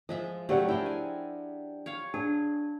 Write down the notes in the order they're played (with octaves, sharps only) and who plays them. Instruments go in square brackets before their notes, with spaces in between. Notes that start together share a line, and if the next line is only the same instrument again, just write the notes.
[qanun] F3 G#3 E5 [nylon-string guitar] D#5
[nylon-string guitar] C#3 F#3 C#4 [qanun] A3 C4 [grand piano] G4 D5 F#5
[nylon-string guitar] D4 E4 [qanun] G#4 A#4 G5
[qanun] G#5
C#5 F5
[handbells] D4 [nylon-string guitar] G#4